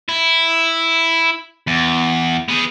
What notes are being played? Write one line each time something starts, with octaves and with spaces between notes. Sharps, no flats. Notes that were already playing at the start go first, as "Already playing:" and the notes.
E4
E2
B3 G#4